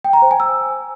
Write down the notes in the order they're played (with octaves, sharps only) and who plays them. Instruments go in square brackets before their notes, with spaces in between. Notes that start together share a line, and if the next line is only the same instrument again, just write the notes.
[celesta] G5
A#5
C5
G#5
E6